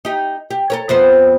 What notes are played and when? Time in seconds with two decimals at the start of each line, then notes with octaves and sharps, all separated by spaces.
0.05 D#4 G4
0.51 G4
0.70 A4 A#4 C#5
0.89 F2 B3 C5